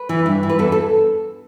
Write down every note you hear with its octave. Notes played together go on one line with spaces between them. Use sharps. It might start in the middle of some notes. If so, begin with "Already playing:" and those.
Already playing: B4
E3
G2
E3
B4
E2 A4
A4